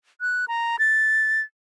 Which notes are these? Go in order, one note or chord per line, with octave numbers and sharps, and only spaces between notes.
F#6
A#5
A6